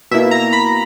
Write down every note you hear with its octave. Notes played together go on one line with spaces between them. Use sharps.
B2 A#3 E4 E5
A#5
B5